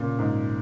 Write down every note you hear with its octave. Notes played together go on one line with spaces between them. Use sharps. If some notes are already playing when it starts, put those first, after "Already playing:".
Already playing: A#2 C#3
G#2